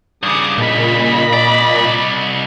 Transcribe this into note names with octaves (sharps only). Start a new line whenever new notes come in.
G2 C#3 D6 D#6
A#2 D#5 B5
C2 D5